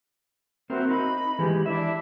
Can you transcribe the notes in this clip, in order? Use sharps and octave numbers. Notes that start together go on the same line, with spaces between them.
C4 F#4 A#4 C5 E5
D#4 B5
E3 G#3 G4
D4 E4 E5